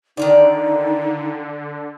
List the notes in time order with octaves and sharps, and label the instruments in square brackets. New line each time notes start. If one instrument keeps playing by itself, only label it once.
[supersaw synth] D3 [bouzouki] D#3 F4 D5 [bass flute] D#4